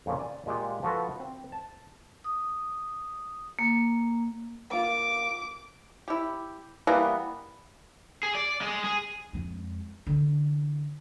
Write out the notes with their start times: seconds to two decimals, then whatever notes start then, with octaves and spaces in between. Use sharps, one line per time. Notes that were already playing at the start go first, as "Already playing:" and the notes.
0.06 F2 A#2 C#3
0.20 D5 G#5
0.46 A#2 G#3 F4 G4
0.83 F3 F#4 A4 B4
1.20 C4
1.52 A5
2.24 D#6
3.59 A#3
4.71 A#3 F4 D6
6.08 E4 G4
6.87 E3 G3 A#3 B3
8.23 G#4
8.35 D5
8.61 G#3
8.84 G#4
9.33 F2 G#3
10.07 D3 E3